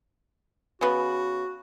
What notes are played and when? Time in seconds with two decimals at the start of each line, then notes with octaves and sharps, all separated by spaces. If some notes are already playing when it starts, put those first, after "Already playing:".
0.81 C#3 B3 F#4